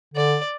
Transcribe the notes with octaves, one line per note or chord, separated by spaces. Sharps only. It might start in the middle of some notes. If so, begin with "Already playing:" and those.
D3 D5